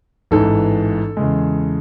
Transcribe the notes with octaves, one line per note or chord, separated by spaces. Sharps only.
A1 G#2 E3 A4
E2 C#3 G#3